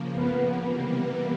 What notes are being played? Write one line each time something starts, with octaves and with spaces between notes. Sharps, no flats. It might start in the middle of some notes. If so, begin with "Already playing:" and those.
Already playing: C#3 F3 A#3
B3
C3 E3 G3 A#3 B3